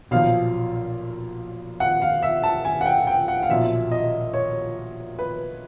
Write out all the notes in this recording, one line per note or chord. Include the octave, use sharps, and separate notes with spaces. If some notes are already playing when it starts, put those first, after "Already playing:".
B1 A#2 F3 F5
F#5
F5
E5
A5
G#5
F#5
G5
G5
F#5
F5
B1 A#2 F3 E5
D#5
C#5
B4